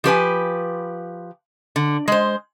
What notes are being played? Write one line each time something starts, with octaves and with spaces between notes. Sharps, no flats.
F3 G4 B4 G#5
D3
G#3 C5